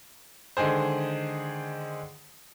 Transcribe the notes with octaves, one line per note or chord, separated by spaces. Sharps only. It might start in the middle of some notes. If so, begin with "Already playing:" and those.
D3 D#3 G#3 G#4 C5